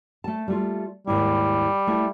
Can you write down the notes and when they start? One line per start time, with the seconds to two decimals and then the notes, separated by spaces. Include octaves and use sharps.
0.24 A3 A5
0.48 G3 A3 F4
1.07 D#2 G#2 G3 E4
1.87 A3 E4